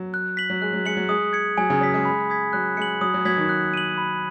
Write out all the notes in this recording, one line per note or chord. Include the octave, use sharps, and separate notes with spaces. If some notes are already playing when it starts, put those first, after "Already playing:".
Already playing: F#3
F#6
B6 F#7
F#3
G#3 F#6
F#3
G#3 C#7 F#7
F#3
G#3 D#6
G#6 C#7
F#3 G#5
C#3
F#3 D#6 B6
G#3
B5
D#6 G#6 B6
F#3 F#6
G#3 C#7 F#7
F#3 D#6
F#3
F#3 G#6 B6 F#7
D#3
F#6
D#7 F#7
B5